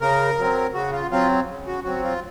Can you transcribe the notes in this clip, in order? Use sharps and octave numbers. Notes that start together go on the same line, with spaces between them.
C#3 A#4
F#3 C4
C#3 F#4
F4
F#3 C4 F4
C#3
F#4
F#3 C4 F#4
F4